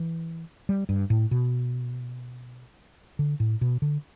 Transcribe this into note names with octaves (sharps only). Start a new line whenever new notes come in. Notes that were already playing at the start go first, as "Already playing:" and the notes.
Already playing: E3
G3
G2
A2
B2
D3
A2
B2
D3